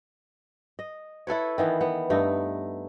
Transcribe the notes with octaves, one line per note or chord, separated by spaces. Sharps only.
D#5
E4 A4 B4 C#5
D#3 E3 B3
B3
G2 A3 D#4